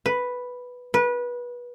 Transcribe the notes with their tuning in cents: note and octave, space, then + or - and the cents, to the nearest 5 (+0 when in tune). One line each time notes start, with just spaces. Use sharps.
B4 +0
B4 -25